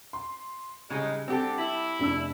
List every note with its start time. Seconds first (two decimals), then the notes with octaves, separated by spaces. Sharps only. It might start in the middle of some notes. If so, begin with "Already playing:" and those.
0.13 C6
0.90 A2 C#3 G3 G#3 D#4
1.28 D3 C4 G4 A4
1.58 E4
1.99 F1 D4 E6